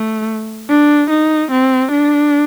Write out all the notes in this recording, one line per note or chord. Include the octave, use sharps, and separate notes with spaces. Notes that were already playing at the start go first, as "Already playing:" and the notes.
Already playing: A3
D4
D#4
C4
D4